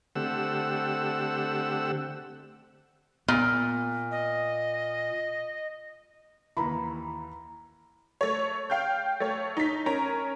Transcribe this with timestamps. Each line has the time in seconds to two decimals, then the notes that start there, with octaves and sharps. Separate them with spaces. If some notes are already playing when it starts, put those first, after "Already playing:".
0.16 D3 A3 C4 G4 F#5 E6
3.28 A#2 B3
4.11 D#5
6.57 D#2 E3 A#5 B5
8.21 A3 C#5
8.70 F5 G5 F6 G6
9.20 A3 C#5
9.57 D#4 B6
9.86 C#4 A#4 A#5